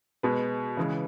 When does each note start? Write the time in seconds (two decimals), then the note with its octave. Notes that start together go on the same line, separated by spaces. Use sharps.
0.23 B2 G#3 B4
0.77 C#3 E3 G#3